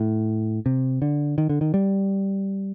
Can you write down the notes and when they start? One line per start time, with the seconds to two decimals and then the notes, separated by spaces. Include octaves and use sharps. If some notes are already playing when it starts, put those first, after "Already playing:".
Already playing: A2
0.66 C3
1.02 D3
1.38 D#3
1.49 D3
1.61 D#3
1.74 G3